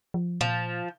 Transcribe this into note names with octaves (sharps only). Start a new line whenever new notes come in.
F3
A#2 F3